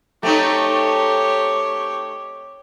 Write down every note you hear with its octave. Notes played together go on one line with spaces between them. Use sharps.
A3 C4 D#4 G4 C#5